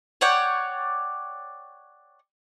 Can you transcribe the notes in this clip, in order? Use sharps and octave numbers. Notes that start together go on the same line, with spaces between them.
C#5 D5 F#5 G5